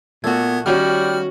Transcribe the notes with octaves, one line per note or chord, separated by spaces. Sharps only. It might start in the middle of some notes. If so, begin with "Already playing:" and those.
A#2 A3 B3 F#4 G#6
D#3 G3 C#4 F#4 F6